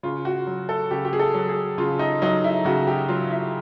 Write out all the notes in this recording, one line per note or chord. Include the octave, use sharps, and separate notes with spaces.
C#3 F4
F#4
F#3
A4
C#3 G4
G4
G#4
A4
F#3
G#4
C#3 F4
D#4
F#3 D#4
E4
C#3 F#4
G4
F#3 F4
E4